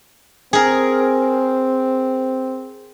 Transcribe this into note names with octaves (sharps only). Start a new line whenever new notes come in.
C4 G#4 A#4